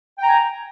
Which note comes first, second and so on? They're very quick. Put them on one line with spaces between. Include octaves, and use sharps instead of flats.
G5 A#5 G#5